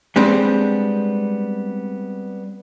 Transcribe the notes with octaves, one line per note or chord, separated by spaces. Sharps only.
G3 G#3 B3 C4 D4